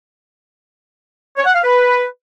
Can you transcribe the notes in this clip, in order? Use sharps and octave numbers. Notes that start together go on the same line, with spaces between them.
C#5
F#5
F5
B4